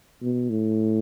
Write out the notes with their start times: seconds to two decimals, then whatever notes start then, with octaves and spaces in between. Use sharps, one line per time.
0.22 B2
0.50 A2